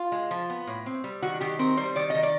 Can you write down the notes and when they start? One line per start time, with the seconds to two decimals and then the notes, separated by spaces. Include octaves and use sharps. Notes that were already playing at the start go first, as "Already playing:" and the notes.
Already playing: F4
0.12 G#3
0.31 F3
0.50 B3
0.67 A2
0.86 C4
1.04 G3
1.22 D#3 F#4
1.41 D#3 G4
1.59 C4 A#4
1.77 G3 C5
1.96 D#3 D5
2.10 D#3 D#5
2.23 D5